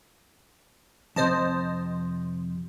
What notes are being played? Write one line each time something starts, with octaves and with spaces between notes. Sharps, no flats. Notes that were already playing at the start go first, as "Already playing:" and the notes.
F2 C3 C5 D#5 A5